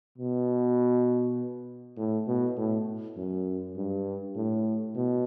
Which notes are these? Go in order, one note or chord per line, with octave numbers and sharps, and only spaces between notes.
B2
A2
B2
A2
F#2
G2
A2
B2